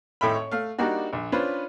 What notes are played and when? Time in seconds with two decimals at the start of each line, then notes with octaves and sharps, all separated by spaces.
0.21 G#1 A2 A4 E5 G5 B5
0.34 C#5
0.51 A3 F5
0.78 G3 A#3 D4 D#4 F#4
1.13 A#1
1.32 C#4 D4 F4 B4 C5